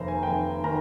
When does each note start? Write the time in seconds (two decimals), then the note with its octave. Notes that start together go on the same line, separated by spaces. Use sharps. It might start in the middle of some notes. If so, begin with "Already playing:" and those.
Already playing: F1 D#2 C5 A#5
0.08 G#5
0.23 G5
0.27 F1 G#5
0.64 D#3 A#5